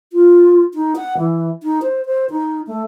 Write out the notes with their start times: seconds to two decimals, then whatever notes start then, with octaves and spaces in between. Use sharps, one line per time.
0.13 F4
0.74 D#4
0.96 F#5
1.18 E3
1.63 D#4
1.82 C5
2.06 C5
2.30 D#4
2.67 A3